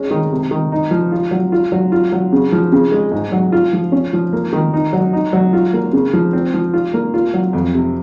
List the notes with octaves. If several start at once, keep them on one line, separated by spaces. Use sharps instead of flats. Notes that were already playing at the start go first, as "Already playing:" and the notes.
Already playing: G#3 C#4
D#3
C3
D#3
D#4
F3
F4
F#3
F4
F#3
F4
F#3
C#3
F3
C#3
G#3
G#2
F#3
F4
F3
C#4
F3
A#3
D#3
D#4
F#3
D#4
F#3
F4
A#3
C#3
F3
C4
F3
F4
A#3
F4
F#3
F2
C3